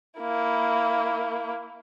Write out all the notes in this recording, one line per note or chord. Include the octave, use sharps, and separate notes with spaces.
A#3 E4